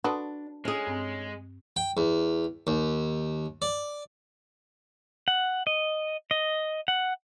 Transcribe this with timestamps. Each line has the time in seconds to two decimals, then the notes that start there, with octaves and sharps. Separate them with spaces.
0.04 D4 F#4 A4 B4 C6 D#6
0.65 G#3 C#4 G#4
0.87 G2 C4 G#5
1.76 G5
1.97 E2
2.67 D#2
3.62 D5
5.28 F#5
5.67 D#5
6.31 D#5
6.88 F#5